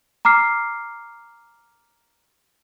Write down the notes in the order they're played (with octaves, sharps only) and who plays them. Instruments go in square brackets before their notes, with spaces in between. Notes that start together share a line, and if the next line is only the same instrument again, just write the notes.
[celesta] A#5 D6 F6 C7